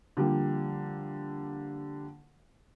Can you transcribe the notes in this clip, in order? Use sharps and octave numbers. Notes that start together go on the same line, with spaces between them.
D3 F3 G3 A#3